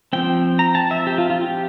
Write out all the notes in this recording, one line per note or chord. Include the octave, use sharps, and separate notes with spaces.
F3 C4 G5
A#5
A5
E5
G4
F4
F4
G4